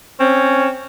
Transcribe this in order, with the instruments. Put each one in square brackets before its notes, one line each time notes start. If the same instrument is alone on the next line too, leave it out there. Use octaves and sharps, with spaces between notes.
[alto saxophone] C4 [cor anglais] C#4